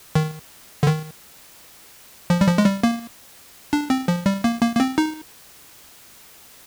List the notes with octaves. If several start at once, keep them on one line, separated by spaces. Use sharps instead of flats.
D#3
D3
D#3
F3
G3
F3
G#3
G3
A#3
D4
C4
F3
G3
A#3
A#3
A#3
C4
D#4